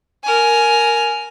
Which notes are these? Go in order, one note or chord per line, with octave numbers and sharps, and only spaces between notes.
A#4 G#5